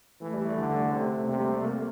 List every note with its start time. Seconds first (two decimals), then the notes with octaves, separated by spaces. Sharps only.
0.21 E3 A3
0.33 G3
0.45 A3
0.57 D3
0.93 C3
1.24 C4
1.29 C3 A#3
1.40 G3
1.53 A3
1.64 A#3